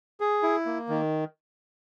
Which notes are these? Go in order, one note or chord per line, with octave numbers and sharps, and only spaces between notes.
G#4
E4
A#3
D#3